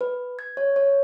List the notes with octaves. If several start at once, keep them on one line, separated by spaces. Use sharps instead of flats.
B4
G#6
C#5
C#5